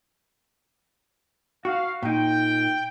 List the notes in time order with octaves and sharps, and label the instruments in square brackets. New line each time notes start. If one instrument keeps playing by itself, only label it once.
[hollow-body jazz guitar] F#4 [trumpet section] F5
[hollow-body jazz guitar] A#2 D#4 [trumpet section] G5